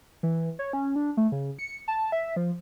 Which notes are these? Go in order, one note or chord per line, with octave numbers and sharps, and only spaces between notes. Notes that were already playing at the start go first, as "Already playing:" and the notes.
E3
C#5
C#4
D4
A3
C#3
C#7
A5
E5
F3